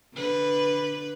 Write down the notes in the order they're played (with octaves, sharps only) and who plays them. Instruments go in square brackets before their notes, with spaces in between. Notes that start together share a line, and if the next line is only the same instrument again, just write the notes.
[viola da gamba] D3 B4